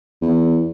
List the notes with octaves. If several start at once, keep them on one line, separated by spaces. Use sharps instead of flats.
E2